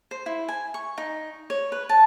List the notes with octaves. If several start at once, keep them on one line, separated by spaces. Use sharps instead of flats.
C5
E4
G#5
C#6
D#4
C#5
B4
A5